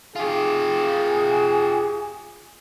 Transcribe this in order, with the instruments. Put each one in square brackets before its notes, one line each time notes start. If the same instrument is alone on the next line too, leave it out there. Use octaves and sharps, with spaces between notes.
[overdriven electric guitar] F4 G4 [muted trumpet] G#4